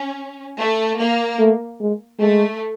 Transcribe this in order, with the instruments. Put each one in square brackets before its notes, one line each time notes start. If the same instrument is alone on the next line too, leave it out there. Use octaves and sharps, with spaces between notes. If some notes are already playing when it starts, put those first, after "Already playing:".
Already playing: [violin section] C#4
A3
A#3
[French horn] A3
G#3
[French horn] G#3 [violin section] A3